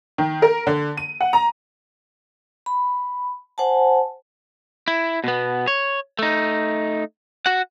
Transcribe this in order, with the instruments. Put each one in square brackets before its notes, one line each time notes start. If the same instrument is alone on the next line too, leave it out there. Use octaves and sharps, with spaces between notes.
[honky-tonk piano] D#3
A#4
D3
D#7
F#5
A#5
[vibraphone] B5
C5 F#5 G#5 A5
[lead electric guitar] E4
B2 B3
C#5
A3 D#4
F#4 F#5